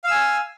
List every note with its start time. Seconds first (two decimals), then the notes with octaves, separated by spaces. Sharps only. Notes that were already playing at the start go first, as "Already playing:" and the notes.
0.04 F5
0.07 E6
0.11 G#5